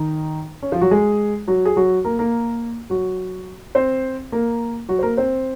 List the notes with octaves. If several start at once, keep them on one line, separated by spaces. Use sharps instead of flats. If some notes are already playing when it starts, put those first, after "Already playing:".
Already playing: D#3 D#4
C#4
F3 F4
F#3 F#4
G#3 G#4
F#3 F#4
G#4
F#3 F#4
A#3 A#4
A#3 A#4
F#3 F#4
C4 C5
A#3 A#4
F#3 F#4
C5
A#3 A#4
C4 C5